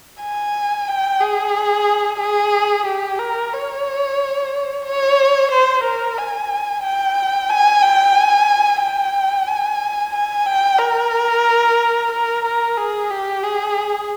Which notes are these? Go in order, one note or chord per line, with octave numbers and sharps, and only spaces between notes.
G#5
G5
G#4
G#4
G4
A#4
C#5
C#5
C5
A#4
G#5
G5
G#5
G5
G#5
G5
G#5
G#5
G5
A#4
A#4
A#4
G#4
G4
G#4